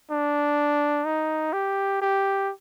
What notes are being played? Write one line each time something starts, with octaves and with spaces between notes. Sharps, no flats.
D4
D#4
G4
G4